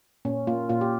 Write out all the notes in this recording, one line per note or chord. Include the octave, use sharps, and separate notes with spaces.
A#2 C#4
A#3 F4
A#2 F4
G4